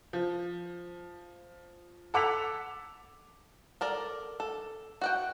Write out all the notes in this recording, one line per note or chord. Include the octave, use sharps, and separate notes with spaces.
F3
A4 F#5 D6 E6 B6 F7
A4 A#4 D5
A4
F#4 F#5 G5